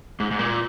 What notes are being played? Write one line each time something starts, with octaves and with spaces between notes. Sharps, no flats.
G#2
G#2
A#2